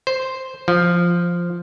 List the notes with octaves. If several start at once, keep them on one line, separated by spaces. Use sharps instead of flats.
C5
F3